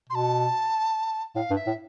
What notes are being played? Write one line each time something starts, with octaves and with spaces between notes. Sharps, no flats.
B2 C6
A5
A2 F5
G2
E5
A2